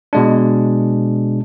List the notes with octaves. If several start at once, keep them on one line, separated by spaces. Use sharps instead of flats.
B2 G#3 D4